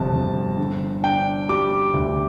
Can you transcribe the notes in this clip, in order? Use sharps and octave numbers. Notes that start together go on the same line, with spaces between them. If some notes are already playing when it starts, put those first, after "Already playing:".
Already playing: G1 F2 C3 A5
G1
D3
D4 G5
G3 D6
D2